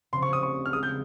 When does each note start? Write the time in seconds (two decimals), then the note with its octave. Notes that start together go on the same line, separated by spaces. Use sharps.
0.12 C#3 F3 C4 C6
0.22 C#6
0.33 D#6
0.43 C#6
0.66 F6
0.72 G#3 D#4 G#4 D#6
0.83 G6